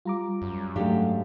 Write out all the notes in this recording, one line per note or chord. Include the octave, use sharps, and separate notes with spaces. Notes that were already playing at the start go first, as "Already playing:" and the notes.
G3 F4 A#5 D6
F#2
G#2 F#3 A3 D4 G4 F5